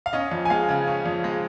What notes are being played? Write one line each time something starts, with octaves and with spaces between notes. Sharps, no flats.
F5
C#4 D#5
F2
G#5
G#3 F5
C#3
C#4
F2
G#3